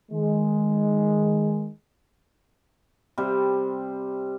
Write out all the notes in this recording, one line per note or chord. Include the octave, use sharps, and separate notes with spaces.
D#3 G#3
C3 G3